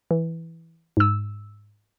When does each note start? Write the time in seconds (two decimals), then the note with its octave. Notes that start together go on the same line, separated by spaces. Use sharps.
0.11 E3
0.97 G#2 E6